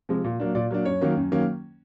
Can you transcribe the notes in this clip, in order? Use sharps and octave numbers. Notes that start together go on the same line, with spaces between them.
C3 F3 G#3
A#2
F#3 A#3 D4
A#2 D5
F#3 A#3 D4
F#2 C#5
D#3 F#3 A#3 C#4
F#2
D#3 F#3 A#3 C#4